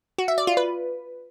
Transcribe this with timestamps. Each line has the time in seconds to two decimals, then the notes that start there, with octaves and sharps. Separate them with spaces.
0.18 F#4
0.28 E5
0.38 D5
0.47 F4
0.57 B4